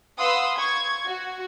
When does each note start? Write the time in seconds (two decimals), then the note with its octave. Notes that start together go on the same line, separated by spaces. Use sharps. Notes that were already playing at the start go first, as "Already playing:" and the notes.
0.18 B4 F5 F#5 C6 D#6 E6
0.57 C#6 G#6
1.07 F#4